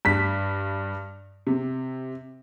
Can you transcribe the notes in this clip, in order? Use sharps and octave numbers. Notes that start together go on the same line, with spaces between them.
G2 B6
C3